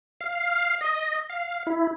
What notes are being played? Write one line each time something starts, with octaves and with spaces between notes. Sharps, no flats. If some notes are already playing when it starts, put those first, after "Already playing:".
F5
D#5
F5
E4